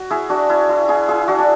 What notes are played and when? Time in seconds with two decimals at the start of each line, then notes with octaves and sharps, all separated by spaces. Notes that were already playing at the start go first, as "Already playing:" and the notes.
Already playing: F#4
0.11 E4 G#4
0.29 D4 F#4
0.50 E4
0.69 E4
0.89 E4 G#4
1.08 E4 G#4
1.28 D4 F#4
1.38 D4